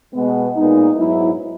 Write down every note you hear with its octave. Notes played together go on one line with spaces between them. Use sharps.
B2 G#3 B3
A#2 G#3 B3 D#4
G#2 F#3 B3 E4